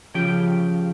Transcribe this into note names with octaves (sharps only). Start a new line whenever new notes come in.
C#3 F3 G4 G5